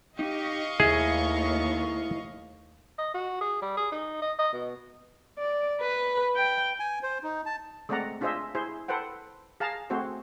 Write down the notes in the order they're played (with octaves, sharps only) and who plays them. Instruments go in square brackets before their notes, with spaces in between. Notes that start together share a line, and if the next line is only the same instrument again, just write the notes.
[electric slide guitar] D#4 [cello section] G4 [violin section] D#5 F5 C#6
[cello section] D#2 A3 [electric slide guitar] E4 B4 E5 [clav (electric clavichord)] G#4
[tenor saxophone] D#5
F#4
G#4
G3
G#4
D#4
D#5
D#5
B2
[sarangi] D5
B4
G5
[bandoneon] G#5
C5
D#4
A5
[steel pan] G#3 A3 C4 D5 F#5 A#5
D4 F4 G#4 C5 D#5 E5
E4 G#4 C5
A4 B4 C5 F#5 G5
G#4 F5 A5 A#5
A3 C4 F#4 G#4 C5